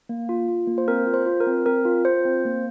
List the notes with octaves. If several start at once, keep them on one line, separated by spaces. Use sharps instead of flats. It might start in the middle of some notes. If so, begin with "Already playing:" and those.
A#3
F4
F4
A#3
C5
C4 A#4
F4
C5
F4
A#4
C4
C4 A#4
F4
F4 C5
C4
A#3